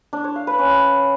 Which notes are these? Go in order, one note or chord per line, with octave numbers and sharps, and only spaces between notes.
D4
C#5
F5
B4
C#4